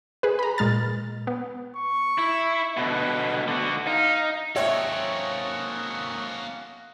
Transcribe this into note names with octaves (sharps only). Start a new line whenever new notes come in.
G#4 B4
A#5 B5
A#2 G#3 F6 A6
B3
C#6
E4
B2 D3 B4
D3 F#4
D#4 F5
A#3 C4 C#4 D#4 F#4 A4 C#5 E5